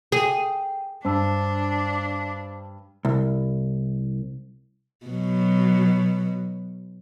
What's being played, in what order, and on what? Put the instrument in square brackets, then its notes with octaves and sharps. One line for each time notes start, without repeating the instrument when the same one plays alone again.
[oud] G#4 [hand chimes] G5
[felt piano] G2 [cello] D4 [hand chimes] C5 A5 E6
[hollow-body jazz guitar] C2
[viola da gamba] B2 F#3